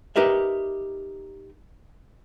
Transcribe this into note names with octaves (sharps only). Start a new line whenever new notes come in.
D#4 G4 A#4 B4 E5